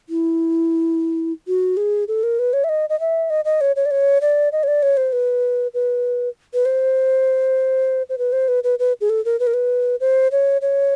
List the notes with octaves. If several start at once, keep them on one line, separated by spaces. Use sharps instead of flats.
E4
F#4
G#4
A4
A#4
B4
C#5
E5
D#5
D#5
E5
D#5
D#5
C#5
C#5
D5
C#5
D5
D#5
C#5
D5
C#5
C5
B4
B4
B4
C5
C5
B4
C5
B4
B4
B4
G#4
A4
A#4
B4
A#4
B4
C5
C#5
C#5